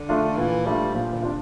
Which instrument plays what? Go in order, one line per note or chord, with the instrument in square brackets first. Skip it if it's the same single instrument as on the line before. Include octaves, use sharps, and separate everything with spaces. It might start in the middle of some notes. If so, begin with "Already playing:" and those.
Already playing: [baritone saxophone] D3
[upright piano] A3 D4 F4
[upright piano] A#2 [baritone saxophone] E3
[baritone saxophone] G3 [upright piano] A3 D4 F4
[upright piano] A#2 [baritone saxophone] F3
[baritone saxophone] D3
[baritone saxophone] C3 [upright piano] D4 F4